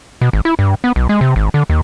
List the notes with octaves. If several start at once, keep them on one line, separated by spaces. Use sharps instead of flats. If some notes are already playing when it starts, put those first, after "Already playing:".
B2
G#1
E4
G2
B3
B1
G#3
C3
G#1
D3
D#2